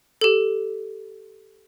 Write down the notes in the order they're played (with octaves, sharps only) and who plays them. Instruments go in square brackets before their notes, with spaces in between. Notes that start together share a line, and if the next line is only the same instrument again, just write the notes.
[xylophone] G4 A4